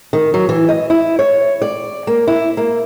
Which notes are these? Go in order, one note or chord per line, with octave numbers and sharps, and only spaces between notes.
D#3
F#3
E3
D#5
E4
C#5
D5
A#3
E4
A#3